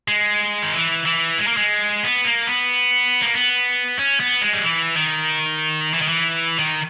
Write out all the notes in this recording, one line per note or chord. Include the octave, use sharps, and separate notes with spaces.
G#3
D#3
E3
E3
G#3
A#3
G#3
B3
A#3
B3
A#3
B3
C#4
B3
G#3
G3
E3
D#3
E3
D#3
E3
D#3